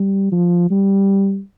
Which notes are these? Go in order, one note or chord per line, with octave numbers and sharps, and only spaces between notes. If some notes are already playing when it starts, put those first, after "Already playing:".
Already playing: G3
F3
G3